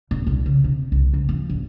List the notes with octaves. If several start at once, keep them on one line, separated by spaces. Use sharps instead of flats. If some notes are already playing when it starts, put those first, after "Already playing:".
D#1
C2
C#3
C3
C2
C#2
F3
D#1